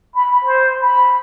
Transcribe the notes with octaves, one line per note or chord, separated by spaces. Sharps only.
B5
C5
B5